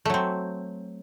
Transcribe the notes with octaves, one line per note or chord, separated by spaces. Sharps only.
F#3 A3 C4